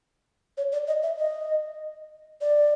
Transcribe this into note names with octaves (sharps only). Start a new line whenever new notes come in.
C#5
D5
D#5
E5
D#5
D5